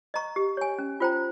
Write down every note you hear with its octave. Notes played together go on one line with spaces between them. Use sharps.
D#5 A#5 C#6
G4
C#5 G#5
C#4
F4 C5 G5 A#5